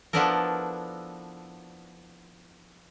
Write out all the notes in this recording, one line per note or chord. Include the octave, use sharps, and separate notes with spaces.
F3 B3 D4 E4 A4 A#4